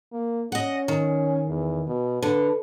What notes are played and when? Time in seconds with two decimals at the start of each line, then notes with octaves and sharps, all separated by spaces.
0.13 A#3
0.52 C#4 D#5 F#5
0.88 D#3
1.48 E2
1.87 B2
2.22 D3 B4